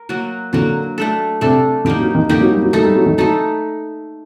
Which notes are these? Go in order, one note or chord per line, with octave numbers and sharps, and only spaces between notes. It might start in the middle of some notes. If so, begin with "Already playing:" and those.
Already playing: A#4
F#3 A#3 F#4
D3 F#3 A#3 F#4
A3 D4 A4
C3 A3 D4 A4
D3 A#3 D#4 G4
F#3
D#3
D3 A#3 D#4 G4
F#3
G3
F#3
F#3 A3 D#4 A4
G3
F#3
D#3
F#3 A3 D#4 A4